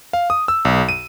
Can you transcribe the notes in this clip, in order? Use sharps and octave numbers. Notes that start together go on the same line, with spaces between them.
F5
D#6
E6
B1
D#7